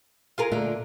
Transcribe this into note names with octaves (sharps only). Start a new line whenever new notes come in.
F4 G#4 A#4
A#2 D3 A3 A#3